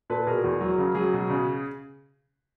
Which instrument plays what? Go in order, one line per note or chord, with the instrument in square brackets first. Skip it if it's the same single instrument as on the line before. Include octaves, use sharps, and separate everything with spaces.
[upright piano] A#2 A4 B4
B2 G#4 A#4
E2
F#3
C#3
F#3 G#4
B2
C#3